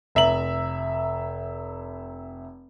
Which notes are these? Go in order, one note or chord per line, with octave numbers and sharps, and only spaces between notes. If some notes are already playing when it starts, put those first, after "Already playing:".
F1 E5 A#5 F#7